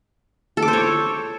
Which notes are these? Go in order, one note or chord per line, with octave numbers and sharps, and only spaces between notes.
A4
D6
C5
C#5